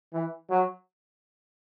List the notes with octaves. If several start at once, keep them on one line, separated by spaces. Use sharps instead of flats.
E3
F#3